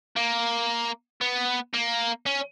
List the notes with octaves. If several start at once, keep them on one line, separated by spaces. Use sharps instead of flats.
A#3
B3
A#3
C#4